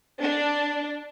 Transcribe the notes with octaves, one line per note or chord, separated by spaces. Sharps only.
D4